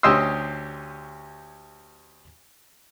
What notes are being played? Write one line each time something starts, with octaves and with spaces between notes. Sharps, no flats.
D2 C#4 G4 D#5 C6 E6